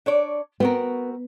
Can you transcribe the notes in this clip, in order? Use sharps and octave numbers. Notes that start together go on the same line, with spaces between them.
D4 C#5 D5
B3 C4 F#4 A#4